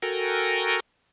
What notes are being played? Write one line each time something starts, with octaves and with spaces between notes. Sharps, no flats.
F#4 A4 A#4 G5 G#5 A#5